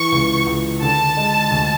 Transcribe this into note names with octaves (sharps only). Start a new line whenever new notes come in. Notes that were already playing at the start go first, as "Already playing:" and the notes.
Already playing: E3 C#6
C#2
C#2
D3 A5
G#3
D2